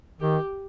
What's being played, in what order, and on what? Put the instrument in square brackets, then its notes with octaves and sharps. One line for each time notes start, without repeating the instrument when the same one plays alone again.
[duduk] D#3 [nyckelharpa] G4